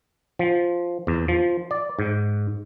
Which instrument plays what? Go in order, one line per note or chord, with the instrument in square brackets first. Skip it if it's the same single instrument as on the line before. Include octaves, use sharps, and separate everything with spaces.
[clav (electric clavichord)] F3
E2
F3
D5
G#2